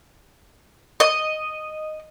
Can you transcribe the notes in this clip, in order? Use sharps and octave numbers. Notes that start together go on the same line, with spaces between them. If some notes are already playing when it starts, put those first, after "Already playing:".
D#5